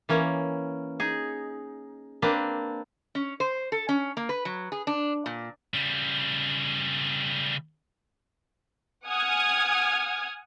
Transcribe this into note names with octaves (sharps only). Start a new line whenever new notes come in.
E3 A#3 C#4
D#4 G#4
A#3 C4 D4 B4
C#4
C5
A4
C#4
A#3
B4
F#3
G#4
D4
A#2
C#3 G3
F#5 G#5 D#6 F6 G#6